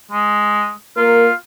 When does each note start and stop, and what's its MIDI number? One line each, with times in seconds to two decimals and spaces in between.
0.11 0.72 56
0.97 1.28 58
0.97 1.34 65
0.97 1.28 70